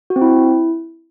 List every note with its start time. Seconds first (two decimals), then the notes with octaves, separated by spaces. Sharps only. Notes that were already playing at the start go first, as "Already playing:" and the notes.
0.10 F#4
0.16 C4
0.22 E4